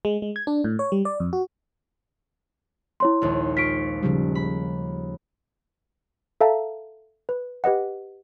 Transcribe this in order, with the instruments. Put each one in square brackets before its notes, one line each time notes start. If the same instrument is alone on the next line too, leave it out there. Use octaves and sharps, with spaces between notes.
[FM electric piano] G#3
G#3
G#6
D4
A2
C#5
G3
D5
F2
F#4
[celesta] E4 C#5 C6
[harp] A#1 D#2 G#3
[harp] F4 C#6 [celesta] B6 D7
[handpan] C#3 F3 G3
[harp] B5
[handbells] A4 E5 F5 A5 A#5
B4
G4 B4 D#5 F#5